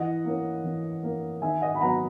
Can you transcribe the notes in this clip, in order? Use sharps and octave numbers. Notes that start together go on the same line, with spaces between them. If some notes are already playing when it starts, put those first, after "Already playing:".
Already playing: E3 D#5 F#5
A#3 C#4
E3
A#3 C#4
D#3 E5 G#5
D#5 F#5
B5
F#3 B3 F#5 A#5